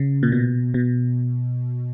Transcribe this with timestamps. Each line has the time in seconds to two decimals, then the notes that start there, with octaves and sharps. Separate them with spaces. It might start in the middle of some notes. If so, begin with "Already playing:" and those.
Already playing: C#3
0.23 A#2
0.32 B2
0.74 B2